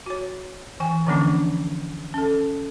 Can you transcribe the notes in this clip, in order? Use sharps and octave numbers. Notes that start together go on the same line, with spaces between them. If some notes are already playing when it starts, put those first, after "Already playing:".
F#4 C#5
E3 G5 G#5
D3 E3 F3 A#3 C#4 D4
C#4 A4